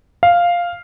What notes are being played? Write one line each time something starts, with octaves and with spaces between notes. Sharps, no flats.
F5